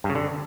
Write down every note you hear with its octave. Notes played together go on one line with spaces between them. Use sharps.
G2
C#3
D3